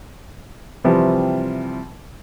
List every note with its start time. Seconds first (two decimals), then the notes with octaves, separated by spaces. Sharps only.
0.84 C3 E3 F3 G3 C4